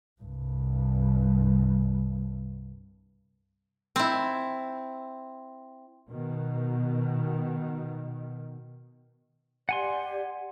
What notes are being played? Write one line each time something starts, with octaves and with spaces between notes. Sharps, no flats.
C2 G2
C4 E4
B2 D#3
G4 D5 F#5 G#5 C6